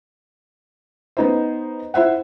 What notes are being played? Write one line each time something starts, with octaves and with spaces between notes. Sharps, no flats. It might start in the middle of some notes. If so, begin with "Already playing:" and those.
B3 D#4 C5
E4 C5 E5 F#5